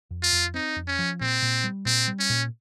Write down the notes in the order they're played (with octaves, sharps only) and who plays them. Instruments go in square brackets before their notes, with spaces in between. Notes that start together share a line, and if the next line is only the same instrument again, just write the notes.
[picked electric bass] F2
[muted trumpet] F4
[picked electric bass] F2
[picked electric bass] C4 [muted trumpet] D#4
[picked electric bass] F2
[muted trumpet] C#4
[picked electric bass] F3
[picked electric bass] A#2 [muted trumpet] C4
[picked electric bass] A#2
G3
[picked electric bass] A#2 [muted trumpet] C4
[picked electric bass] G3
[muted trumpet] C#4
[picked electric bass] A#2